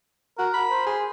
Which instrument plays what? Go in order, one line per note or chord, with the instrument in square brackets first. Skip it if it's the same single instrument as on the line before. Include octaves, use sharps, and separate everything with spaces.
[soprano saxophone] F#4 [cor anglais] A#4
[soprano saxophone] B5
[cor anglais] C5
[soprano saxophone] G#4